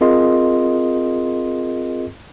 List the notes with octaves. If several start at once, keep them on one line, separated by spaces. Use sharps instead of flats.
C4 F4 G#4 A#4 D#5 C6